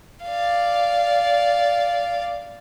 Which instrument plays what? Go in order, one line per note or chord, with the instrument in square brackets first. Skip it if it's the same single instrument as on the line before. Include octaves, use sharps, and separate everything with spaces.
[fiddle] D5 F5